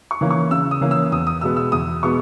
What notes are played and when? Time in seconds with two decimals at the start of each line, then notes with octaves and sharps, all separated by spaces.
0.11 C#6
0.21 E3 A#3 C#4
0.31 C#6
0.51 C#3 E6
0.71 D#6
0.81 E3 A#3 C#4
0.91 E6
1.12 E2 D#6
1.27 D#6
1.41 B2 G#3 B3 E6
1.56 E6
1.72 E2 D#6
2.02 B2 G#3 B3 C#6